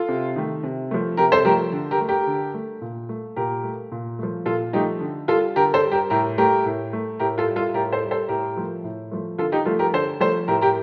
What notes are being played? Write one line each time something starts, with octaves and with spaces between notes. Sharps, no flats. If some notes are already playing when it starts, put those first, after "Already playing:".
Already playing: F4 A4
C3
D#3 A3
C3
F3 A3
C3 G4 A#4
A4 C5
F3 A3 G4 A#4
D3
G4 A#4
A3
G4 A#4
D3
A3
A#2
A3
A#2 G4 A#4
A3
A#2
F3 A3
A#2 F4 A4
F3 A3 D#4 G4
D3
G3 F4 A4
D3 G4 A#4
A4 C5
G3
G4 A#4
A2 G4 A#4
A3 G4 A#4
A2
A3
A2 G4 A#4
F4 A4
G3
F4 A4
A2 G4 A#4
A4 C5
G3
A4 C5
A2 G4 A#4
F3 A3
A2
F3 A3
D3 F4 A4
D#4 G4
F3 A3 F4 A4
G4 A#4
D3 A4 C5
F3 A3 A4 C5
A2 G4 A#4
G4 A#4